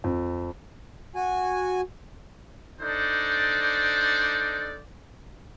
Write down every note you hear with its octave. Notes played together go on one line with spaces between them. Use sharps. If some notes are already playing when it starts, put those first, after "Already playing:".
F2
F#4 G#5
D4 D#4 A4 C5 D5